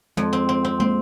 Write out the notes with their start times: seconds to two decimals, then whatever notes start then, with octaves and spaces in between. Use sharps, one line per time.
0.17 F2 G#3
0.33 C4
0.49 C4
0.65 C4
0.80 G#3 A#3 C4